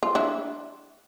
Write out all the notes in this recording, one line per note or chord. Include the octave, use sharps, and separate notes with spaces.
F4
D4 E4